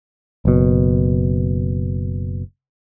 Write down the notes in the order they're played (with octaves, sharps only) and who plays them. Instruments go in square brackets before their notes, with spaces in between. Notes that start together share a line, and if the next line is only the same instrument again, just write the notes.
[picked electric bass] F#1 B2